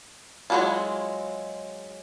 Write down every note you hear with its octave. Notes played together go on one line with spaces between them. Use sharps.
F#3 G#3 D4 E4 F4